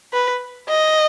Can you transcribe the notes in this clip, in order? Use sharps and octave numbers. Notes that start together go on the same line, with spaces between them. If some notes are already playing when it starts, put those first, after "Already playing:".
B4
D#5